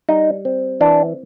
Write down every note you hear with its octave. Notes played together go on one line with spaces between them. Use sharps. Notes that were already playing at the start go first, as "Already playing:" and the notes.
G3 D#4
C4
E3 D4